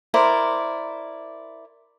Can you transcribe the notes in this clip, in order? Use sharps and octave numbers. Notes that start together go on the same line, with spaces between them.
E4 A#4 C5 D5